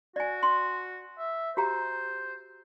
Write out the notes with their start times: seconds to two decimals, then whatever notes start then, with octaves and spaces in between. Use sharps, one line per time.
0.16 F#4 D5 G#5
0.43 C6
1.18 E5
1.57 F#4 G4 C5 A#5